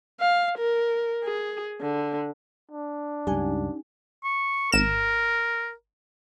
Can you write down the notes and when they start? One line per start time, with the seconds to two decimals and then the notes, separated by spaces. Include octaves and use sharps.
0.20 F5
0.58 A#4
1.24 G#4
1.81 D3
2.72 D4
3.27 C#2 G2 C#4 D#4 G4 F#5 G#5
4.24 C#6
4.72 G#1 A#4 E7